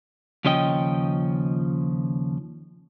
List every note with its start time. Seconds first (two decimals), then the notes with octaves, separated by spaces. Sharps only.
0.45 D#2 C#3 F3 C#4 D#5 G5